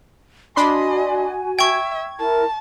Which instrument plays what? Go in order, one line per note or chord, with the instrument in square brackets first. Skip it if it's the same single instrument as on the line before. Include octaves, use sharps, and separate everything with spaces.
[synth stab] D4 B5 C6 [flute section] F#4 G#5 [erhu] D#5
[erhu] E5 [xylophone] G5 C#6 [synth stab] G#6
[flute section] E4 A#4 [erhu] A5